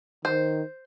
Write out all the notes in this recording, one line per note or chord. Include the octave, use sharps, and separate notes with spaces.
D#3 C5